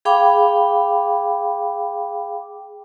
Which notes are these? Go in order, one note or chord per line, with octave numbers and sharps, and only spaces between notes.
G#4 F5 G5 B5 D6